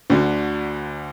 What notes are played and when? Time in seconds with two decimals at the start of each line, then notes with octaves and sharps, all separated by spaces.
0.10 D2 D3